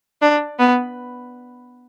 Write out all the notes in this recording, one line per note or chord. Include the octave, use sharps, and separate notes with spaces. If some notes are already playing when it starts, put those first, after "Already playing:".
D4
B3